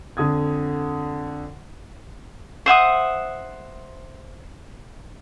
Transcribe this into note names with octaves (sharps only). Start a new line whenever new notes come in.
F2 D3 D#6 G#6
C5 E5 F#5 D#6